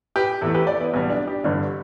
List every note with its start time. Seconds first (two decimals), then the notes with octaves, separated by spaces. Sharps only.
0.16 G4 B4
0.41 E2 E3 A3 E4 A4
0.54 G4 B4
0.67 A4 D5
0.80 B3 E4
0.93 B1 B2 G3 B3
1.10 D4
1.27 D4 G4
1.44 G1 G2 D3 G3